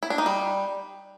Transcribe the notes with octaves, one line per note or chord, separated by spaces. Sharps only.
E4
D4
D#4
G3